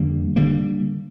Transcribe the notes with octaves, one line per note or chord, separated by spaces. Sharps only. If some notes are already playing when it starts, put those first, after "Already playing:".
Already playing: F2 D3 G3 A#3
D3 G3 A#3